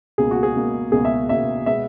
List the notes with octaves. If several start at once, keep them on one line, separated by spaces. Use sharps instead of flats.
C#2 B2 A#3 G#4
F#4
G#4
C#2 B2 A#3
C#2 B2 A#3 G#4
E5
C#2 B2 A#3 E5
B2 G#3 B3 E5